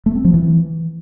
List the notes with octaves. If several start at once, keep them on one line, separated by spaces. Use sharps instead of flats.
A3
C4
F3
E3